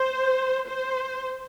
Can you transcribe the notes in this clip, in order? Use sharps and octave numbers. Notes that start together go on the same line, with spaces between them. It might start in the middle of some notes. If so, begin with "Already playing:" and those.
Already playing: C5
C5